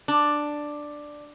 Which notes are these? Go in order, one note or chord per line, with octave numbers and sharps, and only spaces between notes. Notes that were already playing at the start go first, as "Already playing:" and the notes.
D4